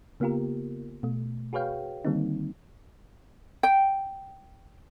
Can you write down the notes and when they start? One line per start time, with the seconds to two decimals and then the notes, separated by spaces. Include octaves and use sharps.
0.20 C#3 A#3 B3 F4 G4 A#4
1.03 B2 A3
1.53 F#4 G#4 B4 C#5 F5 G5
2.05 D3 D#3 G3 A#3 C4 D#4
3.63 G5